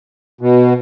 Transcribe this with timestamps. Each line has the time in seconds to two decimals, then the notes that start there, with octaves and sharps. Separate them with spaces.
0.41 B2